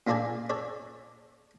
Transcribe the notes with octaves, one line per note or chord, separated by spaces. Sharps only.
A#2 D4 F4 A4 D5 G#5
A4 C#5 D5